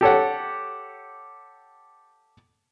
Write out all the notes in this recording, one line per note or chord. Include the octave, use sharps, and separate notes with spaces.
G4 A4 C#5 F#5